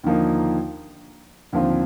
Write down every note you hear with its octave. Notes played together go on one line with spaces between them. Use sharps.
D#2 D3 F3 A#3 D#4
D#2 D3 F3 C4 F4